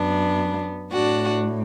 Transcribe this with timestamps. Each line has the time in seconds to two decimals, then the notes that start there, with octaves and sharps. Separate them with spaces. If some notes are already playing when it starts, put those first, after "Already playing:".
Already playing: F#2 B3 D4
0.93 A2 D4 F#4